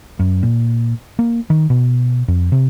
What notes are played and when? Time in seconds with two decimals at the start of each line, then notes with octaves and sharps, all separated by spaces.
0.19 F#2
0.43 A#2
1.19 A#3
1.50 D#3
1.70 B2
2.28 F2
2.52 C3